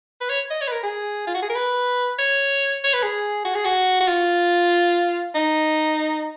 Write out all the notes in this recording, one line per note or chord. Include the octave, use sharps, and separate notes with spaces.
B4
C#5
D#5
C#5
B4
A#4
G#4
F4
F#4
G#4
A#4
B4
C#5
C#5
B4
G#4
F#4
G#4
F#4
F#4
F4
D#4